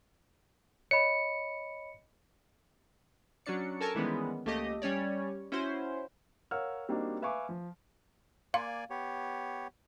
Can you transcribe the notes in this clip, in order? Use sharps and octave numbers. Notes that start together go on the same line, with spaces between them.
C#5 D#5 B5 C#7
F#3 C#4 D4 D5 C#7
A4 A#4 G#5 A5 C#6 E6
D#3 E3 G3 G#3 B3 C#4
C#2 A3 A#3 G4 D#5
G3 C#4 C#5 D5
C#4 E4 F#4 C5
A#4 C#5 F5 F#5 E6 F6
G3 A#3 C4 D4 D#4 F#4
B4 E5 F5 G#5 C#6 D6
F3
A#3 D5 F5 G#5
B3 G4 C#5